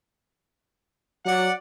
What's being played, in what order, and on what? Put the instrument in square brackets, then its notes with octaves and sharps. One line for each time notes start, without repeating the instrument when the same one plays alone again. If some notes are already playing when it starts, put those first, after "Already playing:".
[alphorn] F#3 [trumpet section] D5 F#5